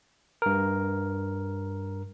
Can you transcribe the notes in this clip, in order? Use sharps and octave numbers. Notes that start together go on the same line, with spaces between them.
G2 A#4